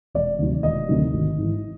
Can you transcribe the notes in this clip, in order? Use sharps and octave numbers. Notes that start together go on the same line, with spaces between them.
E1 D5
D2 C3 D#3 F#3
E1 D#5
D2 C3 D#3 F#3
G#1
G#2 E3